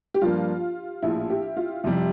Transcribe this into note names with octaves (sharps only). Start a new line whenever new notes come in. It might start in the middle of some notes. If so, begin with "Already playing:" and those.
G4
G2 F3 A#3 D4 F4
A#1 A2 F3 E4
G4
F4
F2 C3 G3 E4